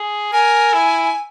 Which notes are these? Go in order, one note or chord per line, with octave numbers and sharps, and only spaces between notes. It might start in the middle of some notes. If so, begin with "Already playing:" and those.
Already playing: G#4
A#4 G#5
E4